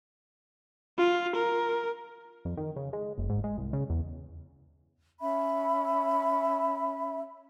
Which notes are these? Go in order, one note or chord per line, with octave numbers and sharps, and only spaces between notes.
F4
A#4
F2
D#3
C#3
G#3
F#1
G#2
G#3
C2
C#3
E2
C#4 E5 B5